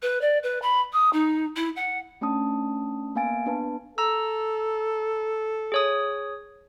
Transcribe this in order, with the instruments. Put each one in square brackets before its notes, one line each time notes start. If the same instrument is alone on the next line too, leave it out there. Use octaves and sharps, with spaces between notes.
[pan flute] B4
D5
B4
B5
D#6
D#4
E4
F#5
[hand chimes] A3 C#4 D4 A5 D#6
A#3 B3 F5 G#5 A6 D7
B3 D4 B4 A5
[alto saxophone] A4 [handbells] A#5 E6
[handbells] G#4 C#5 D#6